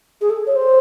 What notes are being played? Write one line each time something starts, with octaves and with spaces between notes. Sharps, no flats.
G#4
A4
C#5
C5